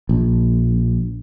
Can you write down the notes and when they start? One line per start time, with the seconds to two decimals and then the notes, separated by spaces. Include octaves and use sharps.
0.09 A#1